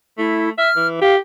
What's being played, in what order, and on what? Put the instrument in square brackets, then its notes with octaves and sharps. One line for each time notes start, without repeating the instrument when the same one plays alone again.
[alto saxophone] A3 [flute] E4
[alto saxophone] E5 [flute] F6
[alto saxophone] E3
[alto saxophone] G4 [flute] F5